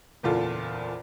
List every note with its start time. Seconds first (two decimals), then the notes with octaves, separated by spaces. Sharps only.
0.23 F#1 E2 A#2 F4 A4